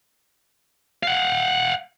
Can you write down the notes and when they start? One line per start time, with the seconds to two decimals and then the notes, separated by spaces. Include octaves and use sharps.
1.03 F5 F#5